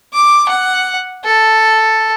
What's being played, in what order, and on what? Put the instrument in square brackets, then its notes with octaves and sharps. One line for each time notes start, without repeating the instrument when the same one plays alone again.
[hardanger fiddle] D6
F#5
A4